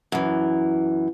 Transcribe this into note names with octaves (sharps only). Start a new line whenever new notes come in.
F#2 E3